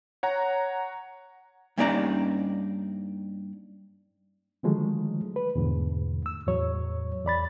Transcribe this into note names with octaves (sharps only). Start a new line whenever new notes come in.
C#5 F#5 A#5
G2 A#3 C#4 D#4 D5 A#5
D3 D#3 F3 F#3 G#3 A3
B4
E2 G#2 B2 D3 A3
E6
E2 A2 F#3 C#5
E2 D5 B5 A6